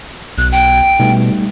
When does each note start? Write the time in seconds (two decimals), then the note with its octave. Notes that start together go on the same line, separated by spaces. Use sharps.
0.38 B1 F#6
0.52 G5
0.99 B2 G3 A3 D#4